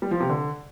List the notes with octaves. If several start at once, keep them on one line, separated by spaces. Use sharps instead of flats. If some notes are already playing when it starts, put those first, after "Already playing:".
G3
F3
C3
D3